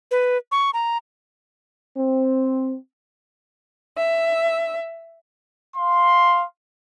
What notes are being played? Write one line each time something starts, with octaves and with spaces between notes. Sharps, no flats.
B4
C#6
A#5
C4
E5
F5 C6